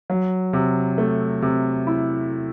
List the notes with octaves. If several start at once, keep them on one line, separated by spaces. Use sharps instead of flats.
F#3
C3
A3
C3
E4